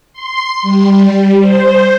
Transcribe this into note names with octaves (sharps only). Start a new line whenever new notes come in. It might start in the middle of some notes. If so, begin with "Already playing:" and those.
C6
G3
C5